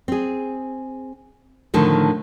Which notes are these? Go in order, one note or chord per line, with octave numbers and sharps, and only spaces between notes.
C4 G#4
A2 D3 D#3 F3 A3